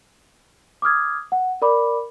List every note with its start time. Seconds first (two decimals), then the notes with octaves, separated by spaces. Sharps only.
0.82 D6 D#6 F6 G#6
1.32 F#5
1.62 A#4 D5 B5 D6